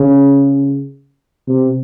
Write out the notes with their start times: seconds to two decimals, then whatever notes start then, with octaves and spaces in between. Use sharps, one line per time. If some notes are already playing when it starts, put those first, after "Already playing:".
Already playing: C#3
1.48 C3